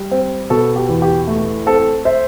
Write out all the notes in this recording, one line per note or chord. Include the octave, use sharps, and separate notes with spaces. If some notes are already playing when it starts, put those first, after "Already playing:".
Already playing: G3
C4
B2 A4
G4
E2
G4
A3
C4 A4
C5 E5